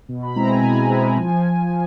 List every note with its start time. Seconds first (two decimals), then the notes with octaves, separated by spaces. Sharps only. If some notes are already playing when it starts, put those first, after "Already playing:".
0.09 B2
0.23 B5
0.36 G#3 C4 E4 A#5
0.49 G#5
0.63 B2 G#5
0.90 G#3 C4 E4
1.17 F3